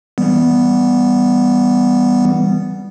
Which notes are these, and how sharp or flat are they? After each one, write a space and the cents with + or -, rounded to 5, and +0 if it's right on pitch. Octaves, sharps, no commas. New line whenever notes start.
E3 +0 G3 +0 B3 +0